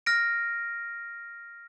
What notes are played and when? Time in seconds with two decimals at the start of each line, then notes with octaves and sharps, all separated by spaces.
0.06 F6 A#6 D7